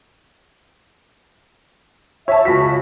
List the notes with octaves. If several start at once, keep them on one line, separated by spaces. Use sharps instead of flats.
C#5 E5 A5
C#2 F#4 B6